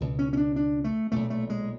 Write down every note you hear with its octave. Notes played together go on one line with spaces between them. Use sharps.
C#2 B2
C#4
C#4
D4
D4
A3
B1 A#2 A3
A3
G#3